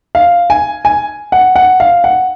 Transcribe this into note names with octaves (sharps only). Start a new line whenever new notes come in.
F5
G#5
G#5
F#5
F#5
F5
F#5